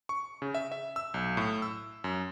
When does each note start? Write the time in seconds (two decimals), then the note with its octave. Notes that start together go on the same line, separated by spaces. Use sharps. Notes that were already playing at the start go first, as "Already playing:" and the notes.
0.09 C#6
0.42 C#3
0.55 E5
0.72 E5
0.96 E6
1.14 B1
1.37 A2
1.62 E6
2.04 F#2